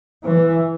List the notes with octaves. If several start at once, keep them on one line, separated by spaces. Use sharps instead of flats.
E3